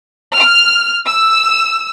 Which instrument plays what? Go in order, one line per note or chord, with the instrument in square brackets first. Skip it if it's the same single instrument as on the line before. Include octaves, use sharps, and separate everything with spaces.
[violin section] F6
E6